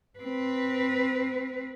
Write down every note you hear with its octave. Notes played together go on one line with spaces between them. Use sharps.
C4 B4